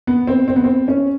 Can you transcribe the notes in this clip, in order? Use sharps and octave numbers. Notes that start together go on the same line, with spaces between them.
B3
C4
C4
B3
C4
C#4